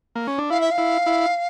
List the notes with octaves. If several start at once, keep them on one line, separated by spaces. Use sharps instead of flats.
A#3
C#4
D4
E4 F5
E5
F5
E4
E4